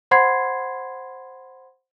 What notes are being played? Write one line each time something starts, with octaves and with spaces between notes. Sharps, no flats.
C5 F#5 B5 C6 G#6 C7